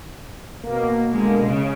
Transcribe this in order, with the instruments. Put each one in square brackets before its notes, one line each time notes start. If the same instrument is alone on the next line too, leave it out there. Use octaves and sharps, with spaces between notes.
[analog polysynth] B2 A#3
[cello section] D3 G#3
C#3